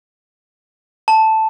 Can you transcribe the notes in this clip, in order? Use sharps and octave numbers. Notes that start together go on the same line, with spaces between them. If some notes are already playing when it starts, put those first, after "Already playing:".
A5